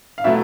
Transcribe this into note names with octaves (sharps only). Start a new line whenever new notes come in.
F5
B2 F#3 A3 E4 E5